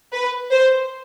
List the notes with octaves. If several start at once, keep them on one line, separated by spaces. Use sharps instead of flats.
B4
C5